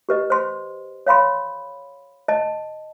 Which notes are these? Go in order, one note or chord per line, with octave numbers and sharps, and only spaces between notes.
G4 B4 D#5
C5 C6
C#5 F5 B5 C6
D#5 A5